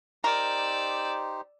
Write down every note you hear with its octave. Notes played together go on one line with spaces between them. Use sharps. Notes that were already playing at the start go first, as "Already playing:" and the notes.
D#4 G4 A#4 C5 D5 E6